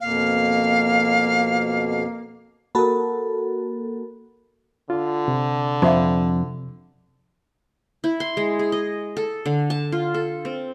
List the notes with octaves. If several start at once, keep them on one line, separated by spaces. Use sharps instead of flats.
F2 B2 A#3 F5
A#3 F#4 A4 A#4 B5
D3 F4
C3
F2 C5 E5 F5
E4
C6
G#3
G#4
D#5
A4
D3
A5
F4
A4
C4